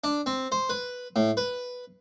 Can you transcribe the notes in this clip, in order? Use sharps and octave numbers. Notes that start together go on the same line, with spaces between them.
D4
C4
C5
B4
A2
B4